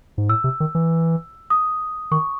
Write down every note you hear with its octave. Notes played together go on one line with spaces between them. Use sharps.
G#2
A2 E6
C3
D#3
E3
D#6
D#3 C#6